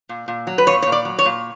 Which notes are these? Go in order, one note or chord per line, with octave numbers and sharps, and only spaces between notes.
A#2
A#2
F#3
B4
A#2 C#5
A#2 C#5
D5
F#3
C#5
A#2